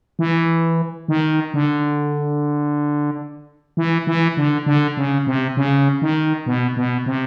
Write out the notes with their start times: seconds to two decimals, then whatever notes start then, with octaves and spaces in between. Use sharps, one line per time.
0.19 E3
1.08 D#3
1.54 D3
3.77 E3
4.07 E3
4.37 D3
4.66 D3
4.97 C#3
5.27 C3
5.57 C#3
6.02 D#3
6.46 B2
6.77 B2
7.06 C3